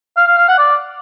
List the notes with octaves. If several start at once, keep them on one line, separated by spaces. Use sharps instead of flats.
F5
F5
F5
F#5
D5